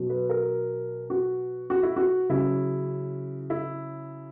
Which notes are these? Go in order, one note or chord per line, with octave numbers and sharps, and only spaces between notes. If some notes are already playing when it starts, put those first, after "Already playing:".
Already playing: B2 F#3
B4
A#4
F#4
F#4
E4
F#4
C#3 F#3 E4
E4